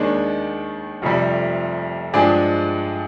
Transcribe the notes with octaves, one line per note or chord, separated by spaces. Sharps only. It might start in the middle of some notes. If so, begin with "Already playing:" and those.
Already playing: D#2 D#3 G#3 D4
F1 F2 C3 G3
G2 F3 G#3 D4 G#4